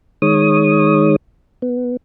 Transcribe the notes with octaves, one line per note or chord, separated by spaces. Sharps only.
D#3 G#3 C#5 D#6
B3